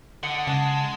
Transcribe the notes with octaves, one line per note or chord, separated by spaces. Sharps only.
D3 D#5 F#5
C#3 G#3 F#5 A5